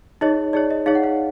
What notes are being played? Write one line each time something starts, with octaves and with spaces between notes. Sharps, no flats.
D#4 G#4 C#5 D#5
D#4 G#4 C#5 D5
D#5
D#4 G#4 C#5 F5
F#5
F5